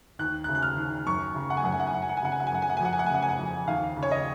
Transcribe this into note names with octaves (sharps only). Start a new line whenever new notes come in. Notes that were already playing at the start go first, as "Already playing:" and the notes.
D#2 F#6
F#6
C#3
F#6
F6
D#2
F#2 C#6
C#3
F#5
G#5
F#2 F#5
G#5
F#5
G#5
F#2 F#5
G#5
F#5
G#5
C#3 F#5
G#5
F#5
G#5
F#2 F#5
G#5
F#5
G#5
F2 F#5
G#5
F#5
G#5
C#3 F#5
G#5
F#5
F2
D#2 F5
C#3
C#5
D#5